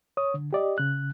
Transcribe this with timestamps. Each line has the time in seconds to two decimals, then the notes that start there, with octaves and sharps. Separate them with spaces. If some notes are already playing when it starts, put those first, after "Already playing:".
0.17 C#5 D#6
0.34 D3
0.53 G4 D5 D#5
0.78 C#3 F#6